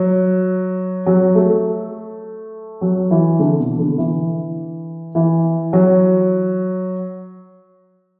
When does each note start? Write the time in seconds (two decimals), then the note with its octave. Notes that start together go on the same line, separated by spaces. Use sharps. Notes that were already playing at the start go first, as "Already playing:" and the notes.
Already playing: F#3
1.06 F#3
1.35 A3
2.81 F#3
3.11 E3
3.39 D3
3.59 B2
3.79 D3
3.98 E3
5.15 E3
5.73 F#3